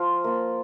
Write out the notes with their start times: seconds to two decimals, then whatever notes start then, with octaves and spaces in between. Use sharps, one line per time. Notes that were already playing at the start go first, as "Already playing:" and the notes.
Already playing: F3 F4
0.24 A#3 F4